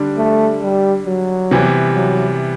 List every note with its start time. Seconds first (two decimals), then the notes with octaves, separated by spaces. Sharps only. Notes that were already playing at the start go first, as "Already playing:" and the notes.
Already playing: D3 G3 D4
0.17 A3
0.62 G3
1.06 F#3
1.51 C3 E3 G3 B3
1.95 F#3